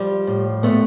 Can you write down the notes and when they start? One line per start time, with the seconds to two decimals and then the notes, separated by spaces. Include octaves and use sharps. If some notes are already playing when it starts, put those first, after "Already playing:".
Already playing: F3 G3
0.27 A2
0.63 A#2 A3 B3